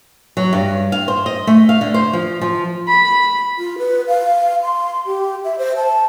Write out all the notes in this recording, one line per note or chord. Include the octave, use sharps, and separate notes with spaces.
F#3
G2
F5
C5
D#5
A3
F5
D3
C5
F3
F3
B5
F4
B4
F5
C6
G4
E5
C5
A5